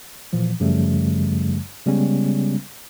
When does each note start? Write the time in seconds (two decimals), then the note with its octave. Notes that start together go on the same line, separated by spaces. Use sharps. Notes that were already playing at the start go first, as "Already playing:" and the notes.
0.33 A#2 E3 F3
0.60 F#2 C#3 F3 G3 A3
1.86 C#3 G3 G#3 B3 C#4